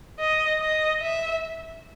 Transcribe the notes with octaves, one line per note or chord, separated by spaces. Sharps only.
D#5
D#5
E5